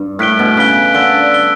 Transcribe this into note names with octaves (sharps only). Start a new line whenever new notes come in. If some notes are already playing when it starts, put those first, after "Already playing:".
Already playing: G2
A2 F#6 B6 D7 G7
B2
C#3 F#6 B6 D7 G7
D3 E6 B6 D7 G7
E6 B6 D7 G7